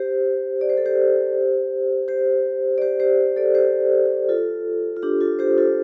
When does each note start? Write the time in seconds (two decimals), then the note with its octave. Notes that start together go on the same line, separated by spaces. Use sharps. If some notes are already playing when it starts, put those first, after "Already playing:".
Already playing: G4 C5
0.61 D5
0.70 C5
0.78 A4
0.86 G4 C5
2.08 G4 C5
2.78 D5
2.82 G4 C5
3.00 G4 C5
3.36 A4 D5
3.55 G4 C5
4.29 F4 A4
4.96 F4
5.02 D4 G4
5.21 F4 A4
5.39 G4 C5
5.58 F4 A4